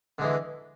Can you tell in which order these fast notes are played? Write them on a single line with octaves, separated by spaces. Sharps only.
D3 G#3 E3